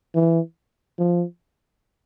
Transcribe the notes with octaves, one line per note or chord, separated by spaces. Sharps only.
E3
F3